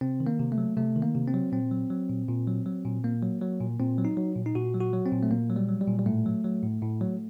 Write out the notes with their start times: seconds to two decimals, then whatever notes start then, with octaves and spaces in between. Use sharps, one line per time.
0.01 C3 C4
0.20 D#3
0.27 A#3
0.39 C3
0.52 A3
0.58 F#3
0.77 C3 A3
0.96 D#3
1.02 A#3
1.15 C3
1.27 C4
1.34 F#3
1.52 A#2 C4
1.71 F#3
1.90 F#3
2.10 A#2
2.28 A#2
2.47 F#3
2.66 F#3
2.85 A#2
3.04 A#2 A#3
3.23 F#3
3.42 F#3
3.60 A#2
3.79 A#2 C4
3.98 F#3
4.05 D#4
4.17 F#3
4.36 A#2
4.46 D#4
4.55 A#2 F#4
4.74 F#3
4.81 F#4
4.93 F#3
5.06 C4
5.12 A#2
5.23 A3
5.31 A#2 A#3
5.50 F#3
5.56 G3
5.69 F#3
5.81 G3
5.87 A#2
5.99 G3
6.06 A2 A3
6.26 F#3
6.44 F#3
6.63 A2
6.82 A2
7.01 F#3